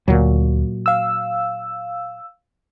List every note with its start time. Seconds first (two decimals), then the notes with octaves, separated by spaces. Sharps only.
0.08 D2 A#2 F#3
0.86 F5 E6